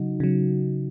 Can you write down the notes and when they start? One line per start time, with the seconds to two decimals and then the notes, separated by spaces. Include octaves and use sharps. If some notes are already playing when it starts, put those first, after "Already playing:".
Already playing: C#3 F#3 D#4 F#4
0.20 C#3 F#3